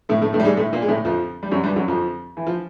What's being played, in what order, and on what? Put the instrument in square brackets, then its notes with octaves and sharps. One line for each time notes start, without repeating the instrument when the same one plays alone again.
[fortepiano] A2 A3
A2 A3
A2 A3
G3
G#2 G#3
A2 A3
A#2 A#3
G#3
A2 A3
F2 F3
G3
F#2 F#3
G2 G3
F#2 F#3
F2 F3
E3
F3